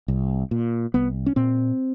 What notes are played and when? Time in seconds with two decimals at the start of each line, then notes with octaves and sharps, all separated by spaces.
0.08 C2
0.51 A#2
0.94 C2 B3
1.26 C#4
1.36 A#2 C4